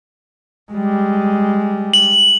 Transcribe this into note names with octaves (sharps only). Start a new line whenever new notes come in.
G3 G#3
F#7